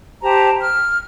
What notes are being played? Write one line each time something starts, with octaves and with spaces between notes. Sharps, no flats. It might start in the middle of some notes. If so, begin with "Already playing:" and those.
G4 C5 A5 A#5
F6